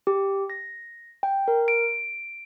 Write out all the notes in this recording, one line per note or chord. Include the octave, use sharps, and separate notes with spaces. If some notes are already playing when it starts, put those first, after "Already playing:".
G4
A#6
G5
A#4
D7